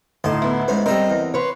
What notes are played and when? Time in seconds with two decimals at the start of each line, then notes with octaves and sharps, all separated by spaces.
0.24 D2 A2 D#4 D#5 A5 C6
0.42 B3 E4
0.68 G#2 C#4 C5
0.86 G3 C4 A4 A#4 C5 D#5
1.10 E2
1.34 B4 C#5 C6